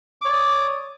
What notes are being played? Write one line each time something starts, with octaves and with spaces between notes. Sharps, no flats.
C#5 D5 D6 D#6